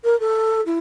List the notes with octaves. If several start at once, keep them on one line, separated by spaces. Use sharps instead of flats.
A#4
A4
E4